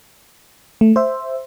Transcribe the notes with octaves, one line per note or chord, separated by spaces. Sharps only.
A3
C5 E5